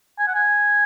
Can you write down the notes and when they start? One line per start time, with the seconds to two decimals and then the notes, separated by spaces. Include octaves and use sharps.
0.19 G#5
0.28 F#5
0.35 G#5